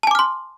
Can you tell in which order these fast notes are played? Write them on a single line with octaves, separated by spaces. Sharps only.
A5 G#5 D6 F6 C6